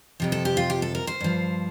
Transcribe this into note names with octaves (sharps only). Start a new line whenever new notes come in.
F2 C3 F3
A4
G4
F4
G4
A4
A#4
C5
G2 F3